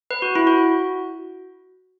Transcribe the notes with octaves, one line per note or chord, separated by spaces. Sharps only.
B4
F#4
E4
F#4